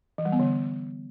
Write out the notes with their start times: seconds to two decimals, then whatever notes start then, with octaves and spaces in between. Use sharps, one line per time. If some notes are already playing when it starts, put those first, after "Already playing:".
0.18 E3
0.25 G3
0.32 B3
0.39 D3